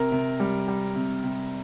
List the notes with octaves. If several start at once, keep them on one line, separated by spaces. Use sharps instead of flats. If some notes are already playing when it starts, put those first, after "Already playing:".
Already playing: C3 A#4
C3
G3
G3
C3
C3